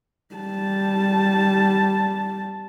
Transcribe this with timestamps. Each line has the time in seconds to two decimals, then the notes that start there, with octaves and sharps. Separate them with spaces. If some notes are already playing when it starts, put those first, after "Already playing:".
0.35 G3 A5